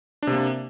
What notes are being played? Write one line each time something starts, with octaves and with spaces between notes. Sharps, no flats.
C3 A#3 D4